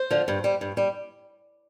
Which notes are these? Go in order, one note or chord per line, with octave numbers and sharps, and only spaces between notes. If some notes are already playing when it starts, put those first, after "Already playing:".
Already playing: C5
D3 F3
G2
G3
G2
G3